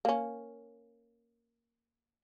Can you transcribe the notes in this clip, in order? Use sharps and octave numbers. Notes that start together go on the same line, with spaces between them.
A#3 C#4